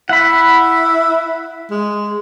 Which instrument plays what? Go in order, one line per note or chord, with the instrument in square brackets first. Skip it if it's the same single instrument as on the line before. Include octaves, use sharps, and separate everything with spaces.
[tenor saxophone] E4 [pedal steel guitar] F#5 B5
[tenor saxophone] G#3